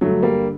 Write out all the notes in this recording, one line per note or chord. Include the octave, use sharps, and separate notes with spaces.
G2 D3 F#3 A3
G3 A#3